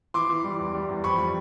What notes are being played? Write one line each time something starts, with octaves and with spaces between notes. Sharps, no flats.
E3 C6 D6
E3
G3
E2
G3
E2
F2 B5 C#6
G3